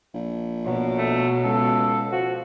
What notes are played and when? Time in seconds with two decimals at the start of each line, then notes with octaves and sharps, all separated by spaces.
0.14 A#1
0.66 B2 F#3
0.98 A3
1.44 C#2 A4
2.12 F3 F#4